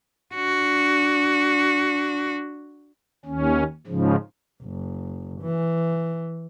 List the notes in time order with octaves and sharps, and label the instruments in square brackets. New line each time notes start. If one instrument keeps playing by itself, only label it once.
[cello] D4 F#4
[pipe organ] D#2 C#4
G#2 C#3 F3
[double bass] F#1
E3